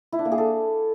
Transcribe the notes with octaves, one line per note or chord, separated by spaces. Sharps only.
E4
D4
A#3
G#4
A4